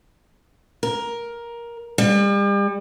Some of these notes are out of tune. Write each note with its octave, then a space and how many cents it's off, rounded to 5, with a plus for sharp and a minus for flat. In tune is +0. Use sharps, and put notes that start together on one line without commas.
A#4 +10
G3 +40